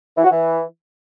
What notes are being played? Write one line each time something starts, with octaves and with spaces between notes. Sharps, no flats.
E3
F#4
E3